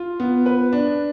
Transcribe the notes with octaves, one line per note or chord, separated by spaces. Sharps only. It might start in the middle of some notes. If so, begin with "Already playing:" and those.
Already playing: F4
B3
B4
D4